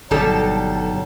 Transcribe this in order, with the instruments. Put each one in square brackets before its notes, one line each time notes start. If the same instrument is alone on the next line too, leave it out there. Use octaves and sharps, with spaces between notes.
[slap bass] G1 [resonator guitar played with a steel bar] B2 G3 A4 [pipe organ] F#3 D#4